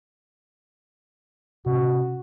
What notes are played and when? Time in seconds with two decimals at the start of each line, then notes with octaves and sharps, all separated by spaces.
1.66 C3 C#4 F#4